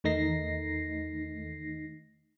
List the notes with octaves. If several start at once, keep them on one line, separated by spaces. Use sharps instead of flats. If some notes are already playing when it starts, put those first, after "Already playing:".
E2 D#3 A3 D#4 A#6 C7